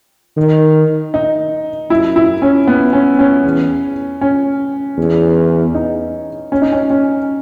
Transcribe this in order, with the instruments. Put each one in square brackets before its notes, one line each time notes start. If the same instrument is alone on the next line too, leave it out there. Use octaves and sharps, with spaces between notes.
[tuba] D#3
[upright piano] D#4
[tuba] F#2 [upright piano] E4
[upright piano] E4
C#4
B3
C#4
C#4
[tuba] E2
[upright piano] C#4
[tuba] E2
[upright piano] D#4
C#4
D#4
C#4
C#4